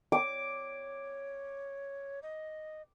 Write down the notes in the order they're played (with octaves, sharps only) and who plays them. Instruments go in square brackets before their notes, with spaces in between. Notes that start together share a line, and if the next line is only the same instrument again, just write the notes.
[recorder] C#5 [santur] D6
[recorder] D#5